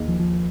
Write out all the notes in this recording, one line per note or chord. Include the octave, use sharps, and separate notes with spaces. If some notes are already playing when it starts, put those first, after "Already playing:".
Already playing: D#2 D#3 A#3 D#4 G#4
F3
F3